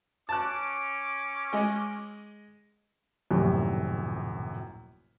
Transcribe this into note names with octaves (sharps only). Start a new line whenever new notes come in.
C#4 A5 D6 F#6
G#3 D#5 G#5
D#1 A#1 F#2 A2 C3